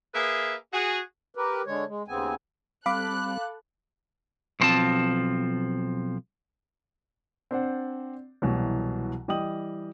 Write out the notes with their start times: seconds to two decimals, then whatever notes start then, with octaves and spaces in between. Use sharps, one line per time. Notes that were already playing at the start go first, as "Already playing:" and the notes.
0.14 A#3 G#4 B4 E5
0.72 F#4 G#4
1.35 G4 A#4 B4
1.66 D3 G#3 C#5
1.88 G#3
2.08 D#2 C#3 B3 C4 G#5
2.86 G3 C4 A4 F5 B5 D6 F#6
4.60 B1 A#2 F3 C4 A5
7.51 C4 D4 C5 D5 F#5
8.42 C2 B2 E3 F#3
9.28 E3 G3 D#5 G5 D#6 F#7